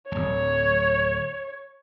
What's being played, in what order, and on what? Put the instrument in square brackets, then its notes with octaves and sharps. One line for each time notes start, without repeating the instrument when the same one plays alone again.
[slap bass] D1 G#1 [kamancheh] C#5